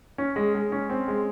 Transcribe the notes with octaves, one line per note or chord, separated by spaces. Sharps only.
C#4
G#3
G#3
C#4
C4
G#3